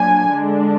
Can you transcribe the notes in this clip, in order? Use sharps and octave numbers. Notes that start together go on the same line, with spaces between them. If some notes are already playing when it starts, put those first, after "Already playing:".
Already playing: A#2 F#3 D4 G#5
D3 G#3 D4